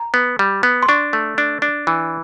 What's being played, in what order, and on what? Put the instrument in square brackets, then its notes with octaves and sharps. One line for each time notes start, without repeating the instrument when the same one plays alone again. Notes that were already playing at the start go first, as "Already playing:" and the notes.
Already playing: [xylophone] A#5
[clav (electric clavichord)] B3
G3
B3
[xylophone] C6
[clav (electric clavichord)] D4 [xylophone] C#6
[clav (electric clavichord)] A3
D4
D4
E3